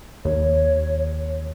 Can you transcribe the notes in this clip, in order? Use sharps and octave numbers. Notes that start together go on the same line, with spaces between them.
D#2 C#5